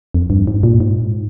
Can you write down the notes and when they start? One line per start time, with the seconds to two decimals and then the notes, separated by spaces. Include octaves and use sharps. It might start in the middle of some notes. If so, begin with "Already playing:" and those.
0.14 F2
0.30 G2
0.47 G#2
0.63 A#2
0.80 G#2